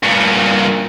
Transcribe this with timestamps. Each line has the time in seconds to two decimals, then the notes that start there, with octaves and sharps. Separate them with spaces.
0.03 G2 A#2